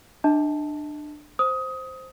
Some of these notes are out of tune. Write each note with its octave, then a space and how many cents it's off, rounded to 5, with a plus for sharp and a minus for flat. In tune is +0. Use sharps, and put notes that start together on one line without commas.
D4 +25 D#5 +40 A5 +0
C5 +0 D#6 +20